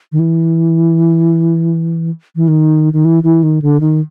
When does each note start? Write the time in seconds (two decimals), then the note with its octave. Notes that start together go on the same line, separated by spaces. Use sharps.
0.12 D#3
0.19 E3
2.36 E3
2.48 D#3
2.93 D#3
3.05 E3
3.23 E3
3.43 D#3
3.62 D3
3.80 D#3